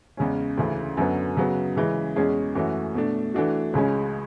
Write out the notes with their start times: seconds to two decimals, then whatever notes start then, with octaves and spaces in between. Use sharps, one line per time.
0.17 E2 C#3 G#3 C#4
0.57 D2 C#3 E3
0.97 F#2 D3 F#3 B3
1.37 C#3 F#3 B3
1.76 C#3 E3 G#3 C#4
2.16 E2 B2 G#3 C#4 G#4
2.55 F#2 E3 A3 C#4 F#4
2.94 B2 A3 D4
3.34 E3 A3 D4 F#4
3.74 C#2 C#3 G#3 C#4